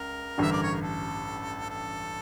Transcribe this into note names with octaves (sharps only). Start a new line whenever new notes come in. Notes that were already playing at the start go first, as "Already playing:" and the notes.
Already playing: C#2 A#4
A1 G2 D3 E5
D5
C#5
A#4
A4
A4